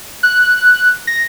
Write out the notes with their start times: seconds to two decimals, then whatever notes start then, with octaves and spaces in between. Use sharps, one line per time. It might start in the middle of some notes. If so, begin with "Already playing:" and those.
0.23 F#6
1.07 A#6